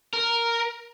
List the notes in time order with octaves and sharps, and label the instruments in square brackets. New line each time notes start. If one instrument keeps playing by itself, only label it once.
[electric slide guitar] A#4